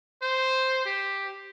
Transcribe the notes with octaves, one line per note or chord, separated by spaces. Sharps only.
C5
G4